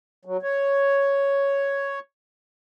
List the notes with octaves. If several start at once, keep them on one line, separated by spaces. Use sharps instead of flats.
F#3
C#5